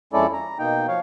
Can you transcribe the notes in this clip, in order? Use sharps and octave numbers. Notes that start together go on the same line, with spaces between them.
F2 G#3 C#4 E4 A4 D5
A#5
B2 A#3 D#4 G5
F3 C#5 F5